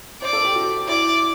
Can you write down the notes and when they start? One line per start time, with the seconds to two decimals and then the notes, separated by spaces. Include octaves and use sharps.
0.22 C5 D5
0.33 A4
0.44 G4
0.55 F#4
0.88 E4 D5